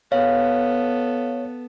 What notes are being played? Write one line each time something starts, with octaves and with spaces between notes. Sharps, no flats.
B3 A4 C#5 F5